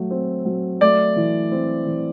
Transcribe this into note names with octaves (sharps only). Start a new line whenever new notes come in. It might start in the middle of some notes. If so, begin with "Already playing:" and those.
Already playing: F#3 A3
C4
F#3
A3 D5
E3
C4
E3